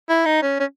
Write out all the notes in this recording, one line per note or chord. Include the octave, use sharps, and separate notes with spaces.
E4
D#4
C#4
C#4